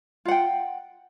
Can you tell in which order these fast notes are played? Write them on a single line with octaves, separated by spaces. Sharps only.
F4 F#5 G5